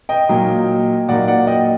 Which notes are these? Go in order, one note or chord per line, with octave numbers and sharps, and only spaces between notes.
D#5 G5
A#2 F#3 A#3 D#4
A#2 F#3 A#3 D#4 D5 F#5
D5 F#5
D#5 G5